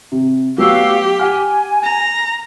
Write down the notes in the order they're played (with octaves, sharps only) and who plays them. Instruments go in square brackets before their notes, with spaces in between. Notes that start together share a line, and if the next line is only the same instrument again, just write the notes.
[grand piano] C3
[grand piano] F#3 A3 B3 [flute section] F#4 F5 E6 [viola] G4
[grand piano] F#5 F6 [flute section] G#5
[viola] A#5